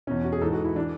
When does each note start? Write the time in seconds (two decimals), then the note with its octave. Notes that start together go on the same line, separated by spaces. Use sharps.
0.07 E2 B2 C#4
0.24 F#4
0.32 G#4
0.41 G#2 E3 A4
0.53 F#4
0.65 E4
0.76 E3 D4